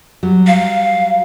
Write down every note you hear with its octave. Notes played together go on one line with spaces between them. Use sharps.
F#3 G3
F5